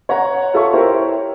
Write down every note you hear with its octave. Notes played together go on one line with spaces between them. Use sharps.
C#5 F#5 A#5
F4 A4 E5 C#6
E4 G4 A#4 C5 C#5